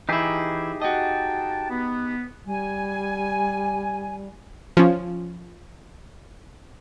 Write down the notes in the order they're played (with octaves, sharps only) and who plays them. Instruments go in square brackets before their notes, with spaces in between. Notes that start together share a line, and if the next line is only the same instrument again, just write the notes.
[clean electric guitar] E3 E4 [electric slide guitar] D#4 G4 G#4
[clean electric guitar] F#4 D#5 [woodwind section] G5 A5
[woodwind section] B3
[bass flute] G3 [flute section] G#5
[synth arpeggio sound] F3 C#4